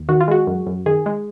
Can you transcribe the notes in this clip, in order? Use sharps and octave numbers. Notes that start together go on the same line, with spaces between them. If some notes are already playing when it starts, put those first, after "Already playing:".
Already playing: D#2
D#3 F#4
F4
G#3 F#4
F#2
F#2
D#3 G#4
G#3